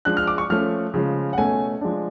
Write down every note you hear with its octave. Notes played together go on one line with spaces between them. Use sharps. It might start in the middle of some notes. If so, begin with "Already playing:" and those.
F3 G#3 D4 F#6
F6
D6
C#6
F3 A3 C#4 F6
C#3 F3 G#3
F#5
B2 A3 C#4 G#5
F3 G#3 D4